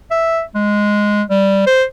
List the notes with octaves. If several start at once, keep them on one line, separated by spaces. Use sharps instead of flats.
E5
G#3
G3
C5